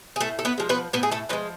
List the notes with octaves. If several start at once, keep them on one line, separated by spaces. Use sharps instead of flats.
G#4
A2 A3 A4
A4
B3 B4
F3 G#3
B3 B4
A2 B3 B4
G#4
A3 A4
F3 G#3 B3 B4